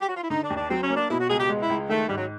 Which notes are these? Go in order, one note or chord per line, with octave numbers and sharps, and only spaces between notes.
G4
F#4
F4
E4
D3 D#4
D4
D#2
D4
F#3 C4
C#4
A#3
D4
B2 E4
F#4
C#2 G#4
G4
G#3
E4
C#2
D#3 A3
G#2 G3
F#3